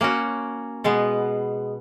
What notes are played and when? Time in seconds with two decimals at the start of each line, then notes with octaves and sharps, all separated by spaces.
0.01 A#3 C#4 F#4
0.84 B2 G#3 B3